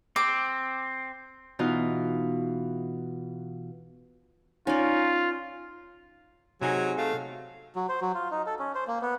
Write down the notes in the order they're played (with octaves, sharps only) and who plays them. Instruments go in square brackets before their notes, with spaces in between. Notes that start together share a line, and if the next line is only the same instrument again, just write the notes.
[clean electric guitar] C4 [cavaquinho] D6
[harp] B2 E3 D#4 F4 B4 F5
[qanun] C#4 D5 [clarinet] D#4 [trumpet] F4
[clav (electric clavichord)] C3 D#4 G#4 [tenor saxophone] F#3 [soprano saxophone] G#5
[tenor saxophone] A3 [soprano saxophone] F5
[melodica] F#3
C5
F#3
F4
D#4
A4
C#4
C5
A#3
B3